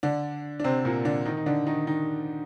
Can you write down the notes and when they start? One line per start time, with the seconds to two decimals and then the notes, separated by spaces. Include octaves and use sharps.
0.03 D3 D4
0.60 D4
0.64 C3 C4
0.85 A#2 A#3
1.05 D3 D4
1.25 D#3 D#4
1.37 D#4
1.46 D3 D4
1.67 D#3 D#4
1.87 D#3 D#4